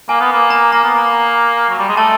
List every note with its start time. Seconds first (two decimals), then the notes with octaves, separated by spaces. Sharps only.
0.09 A#3 G#5
0.20 B3
0.32 A#3
0.50 A#5
0.72 A#3 A#5
0.84 B3
0.95 A#3
1.70 F#3
1.79 G3
1.89 G#3
1.97 A3 A5